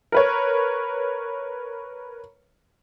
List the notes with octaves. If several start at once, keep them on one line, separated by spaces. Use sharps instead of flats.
A#4 B4 C#5